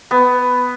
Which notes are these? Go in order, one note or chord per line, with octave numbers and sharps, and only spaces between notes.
B3